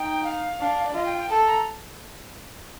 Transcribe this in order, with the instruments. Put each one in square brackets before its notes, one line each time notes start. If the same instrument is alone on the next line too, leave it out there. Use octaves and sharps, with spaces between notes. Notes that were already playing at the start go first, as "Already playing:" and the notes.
Already playing: [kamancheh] D#4 [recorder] G5
[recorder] F5
[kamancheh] D4
[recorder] D5
[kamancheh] F4 [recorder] D#5
[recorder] G5
G5
[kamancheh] A4 [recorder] A5
[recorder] A#5